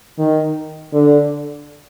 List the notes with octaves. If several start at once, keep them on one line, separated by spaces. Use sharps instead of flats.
D#3
D3